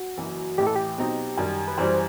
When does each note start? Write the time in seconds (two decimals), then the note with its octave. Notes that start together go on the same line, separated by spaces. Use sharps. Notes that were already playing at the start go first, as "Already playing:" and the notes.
Already playing: F#4
0.18 F#1 F#2 E3
0.58 A1 A2 E3 G4
0.67 A4
0.76 G4
0.98 B2 F#3 C4 D#4
1.37 F#2 D#3 G3
1.68 B4
1.78 F#2 E3 G3 C5